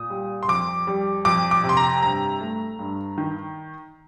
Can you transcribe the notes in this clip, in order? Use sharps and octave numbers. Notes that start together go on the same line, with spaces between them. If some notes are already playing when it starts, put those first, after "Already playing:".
Already playing: A#2 D#6
G3
C6
F2 D6
G3
F2 D6
D6
C3
C6
A#5
G2 A#5
A3
G2
D#3